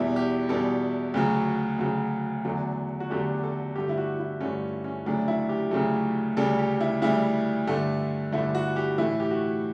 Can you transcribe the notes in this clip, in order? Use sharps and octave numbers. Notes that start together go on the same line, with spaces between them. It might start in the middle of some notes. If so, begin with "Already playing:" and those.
Already playing: E2 B2 G3 E4
G4
E2 B2 G3 A4
D2 C#3 F#3
D2 C#3 F#3
E2 D3 F#3 A3
F#4
E2 D3 F#3 A3 G4
A4
G2 D3 A3 G4
E4
F#4
E4
G2 D3 A3 C#4
C#4
D2 C#3 F#3 A3 D4
E4
G4
D2 C#3 F#3 A3
D2 C#3 G3 A4
G4
E4
D2 C#3 G3 E4
G2 D3 A3
G2 D3 A3 E4
F#4
G4
A2 E3 A3 E4
G4
F#4